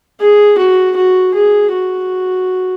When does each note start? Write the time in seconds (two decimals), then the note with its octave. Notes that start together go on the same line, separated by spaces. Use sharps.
0.21 G#4
0.58 F#4
0.97 F#4
1.34 G#4
1.73 F#4